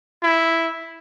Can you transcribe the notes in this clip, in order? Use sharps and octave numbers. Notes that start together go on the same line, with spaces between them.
E4